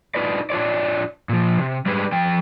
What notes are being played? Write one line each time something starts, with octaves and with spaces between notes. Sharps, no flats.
D4 D#4 F4 B4 D5
D4 F4 C#5 D5
A#2 F3
C3
G3 G#3 D4 G4 B4
F3 G5